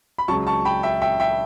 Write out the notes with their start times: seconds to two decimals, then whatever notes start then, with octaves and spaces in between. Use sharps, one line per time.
0.18 B5
0.28 C#2 C#3 F#3 A5 C#6
0.47 A5 C#6
0.65 G5 B5
0.83 E5 G5
1.02 E5 G5
1.20 E5 G5